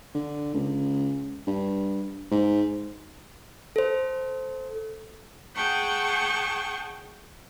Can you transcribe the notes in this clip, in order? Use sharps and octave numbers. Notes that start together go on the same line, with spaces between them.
D3
C#2
G2
G#2
A4 C5
G#4 F#5 G5 A5 C#6